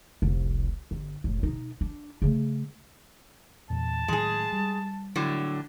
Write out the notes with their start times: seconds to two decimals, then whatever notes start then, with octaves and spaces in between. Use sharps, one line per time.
0.22 F1 C2
0.91 G1
1.24 F1 A2
1.43 B2 D#4
1.81 D4
2.22 C#3 A3
3.70 E2 A#2 A5
4.08 A2 D#3 F#3 G#3 G#4
4.52 G3
5.16 A2 D3 F#3